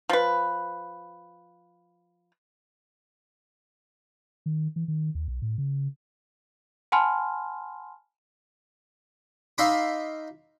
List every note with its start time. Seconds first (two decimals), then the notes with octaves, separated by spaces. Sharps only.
0.09 F3 B4
4.46 D#3
4.76 E3
4.88 D#3
5.15 D#2
5.28 B1
5.42 A2
5.58 C#3
6.92 F#5 G#5 A5 B5 C6 F6
9.58 D#4 E5 F5 B5 C6 D6